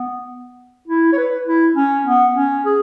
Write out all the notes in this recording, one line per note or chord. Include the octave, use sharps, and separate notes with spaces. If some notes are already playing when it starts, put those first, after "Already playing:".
Already playing: B3
E4
C#5
B4
E4
C#4
B3
C#4
G#4